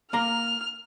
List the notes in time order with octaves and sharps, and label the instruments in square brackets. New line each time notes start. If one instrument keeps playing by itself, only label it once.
[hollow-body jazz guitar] A#3 A#5 [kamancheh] F6